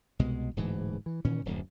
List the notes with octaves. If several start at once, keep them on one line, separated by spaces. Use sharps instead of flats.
C2 B2 G#3
D1 G#2 E3
E3
A#2 D#3 E3 C#4
D1 F#2